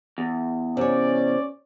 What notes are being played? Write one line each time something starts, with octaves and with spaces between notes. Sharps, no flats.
E2
C3 C#4 C#5 D5